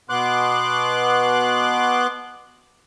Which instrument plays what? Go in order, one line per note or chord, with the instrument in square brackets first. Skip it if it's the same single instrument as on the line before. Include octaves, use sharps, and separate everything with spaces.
[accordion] B2 B3 C6 D6 F#6